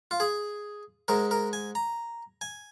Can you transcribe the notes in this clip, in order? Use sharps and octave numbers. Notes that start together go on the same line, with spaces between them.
F4
G#4
G#2 G#3 A#4
A#4
G#5
A#5
G#5